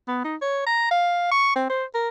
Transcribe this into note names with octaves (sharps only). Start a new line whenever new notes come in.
B3
D#4
C#5
A#5
F5
C#6
C4
C5
A#4